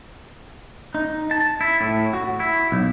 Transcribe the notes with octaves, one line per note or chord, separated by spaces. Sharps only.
D#4
A5
E4
A2
F#4
E4
B1